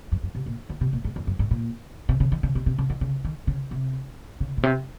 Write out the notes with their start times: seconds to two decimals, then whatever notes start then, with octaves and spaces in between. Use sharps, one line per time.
0.12 F#2
0.23 F#2
0.35 C3
0.46 A#2
0.69 D#3
0.81 C3
0.93 A#2
1.04 G#2
1.16 F2
1.27 F#2
1.39 G#2
1.51 A#2
2.09 C3
2.20 C#3
2.32 D#3
2.43 C#3
2.55 C3
2.66 C3
2.79 C#3
2.90 D#3
3.01 C#3
3.25 D#3
3.47 C#3
3.71 C3
4.40 C#3
4.58 A#2
4.63 C3